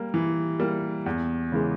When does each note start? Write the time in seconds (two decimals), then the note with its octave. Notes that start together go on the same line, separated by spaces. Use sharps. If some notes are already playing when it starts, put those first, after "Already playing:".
Already playing: G3 A#3
0.14 E3
0.60 G3 A#3
1.06 E2
1.52 C#3 E3 G#3